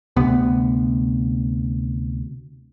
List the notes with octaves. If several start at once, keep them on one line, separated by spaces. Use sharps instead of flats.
D2 C3 B3